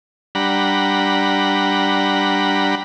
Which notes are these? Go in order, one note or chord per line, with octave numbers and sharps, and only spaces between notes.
G3 D4 F#5 A#5 B5